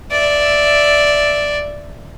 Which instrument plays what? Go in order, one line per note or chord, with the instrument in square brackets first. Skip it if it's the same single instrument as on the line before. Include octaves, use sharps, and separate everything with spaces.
[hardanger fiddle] D5 E5